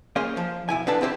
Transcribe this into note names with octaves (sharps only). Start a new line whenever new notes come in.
A#3 C#4 G#4 C5
F3
B1 E4 G#5
D3 B3 D4 B4 A5
C4 E4 G4 C5